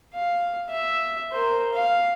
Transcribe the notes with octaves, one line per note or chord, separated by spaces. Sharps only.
F5
E5
A#4 C5
F5